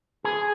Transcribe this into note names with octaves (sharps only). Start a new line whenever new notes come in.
G#4